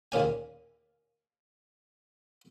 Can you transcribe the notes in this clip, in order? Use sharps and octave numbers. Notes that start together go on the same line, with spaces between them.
D#2 A#2 C#4 G#5